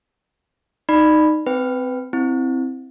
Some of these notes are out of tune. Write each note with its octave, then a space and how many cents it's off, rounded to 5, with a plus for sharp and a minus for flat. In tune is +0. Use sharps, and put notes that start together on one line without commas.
D#4 -5 D5 +30 B5 +0
C4 -20 B4 +15 G5 +0
C4 +0 E4 +0